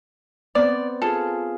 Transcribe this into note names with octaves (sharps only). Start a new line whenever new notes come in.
B3 C4 D5
F4 G#4 A4